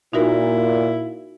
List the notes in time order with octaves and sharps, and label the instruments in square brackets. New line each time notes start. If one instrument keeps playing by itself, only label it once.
[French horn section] A#2 [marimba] D#4 F#4 A#4 [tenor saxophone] E4